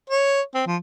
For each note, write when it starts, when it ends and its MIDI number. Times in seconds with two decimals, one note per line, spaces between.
0.09 0.41 73
0.54 0.62 60
0.66 0.76 53